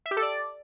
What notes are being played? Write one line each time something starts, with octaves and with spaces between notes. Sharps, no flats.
E5
G4
A4
D5